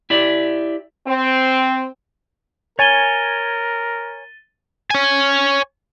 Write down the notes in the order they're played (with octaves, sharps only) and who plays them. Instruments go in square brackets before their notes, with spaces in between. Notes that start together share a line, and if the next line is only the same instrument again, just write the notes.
[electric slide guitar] E4 G4 D5
[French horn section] C4
[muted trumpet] A#4 [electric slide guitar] C#5 G#5 [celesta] A6 D#7 G7
[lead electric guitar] C#5 G#5